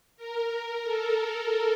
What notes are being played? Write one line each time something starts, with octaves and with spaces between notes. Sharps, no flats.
A#4
A4
A#4